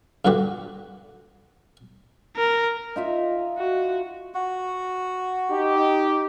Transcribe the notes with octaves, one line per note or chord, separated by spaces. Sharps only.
G2 A#2 D3 F#4 G4
A#4
D#4 F4 E5
F#4
F#4
D#4 G4